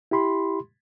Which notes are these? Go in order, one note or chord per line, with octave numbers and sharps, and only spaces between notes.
E4 G4 B5 C6